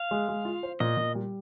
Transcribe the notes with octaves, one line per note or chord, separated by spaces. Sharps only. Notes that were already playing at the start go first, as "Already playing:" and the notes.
Already playing: F5
G#3
G#3
F4
C5
A#2 D#5
A#2
G3